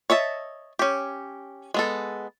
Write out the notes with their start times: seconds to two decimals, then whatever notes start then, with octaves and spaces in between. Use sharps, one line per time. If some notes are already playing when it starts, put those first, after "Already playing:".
0.10 C#5 D#5 E5 A5
0.79 C#4 G4
1.74 G#3 B3 A4